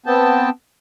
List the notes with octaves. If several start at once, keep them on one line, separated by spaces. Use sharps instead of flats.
B3 C4 G5 A5